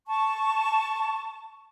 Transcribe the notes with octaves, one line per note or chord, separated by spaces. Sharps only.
A5 C#6